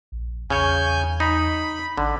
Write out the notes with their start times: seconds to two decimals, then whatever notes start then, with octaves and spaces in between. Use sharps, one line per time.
0.12 A#1
0.50 E2 C#3 C#5 G#5 G6
1.20 D#4 B5
1.97 A1 D3